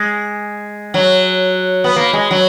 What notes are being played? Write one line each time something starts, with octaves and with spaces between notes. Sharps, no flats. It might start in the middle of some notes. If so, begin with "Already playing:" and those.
Already playing: G#3
F#3
B3
A#3
G#3
F#3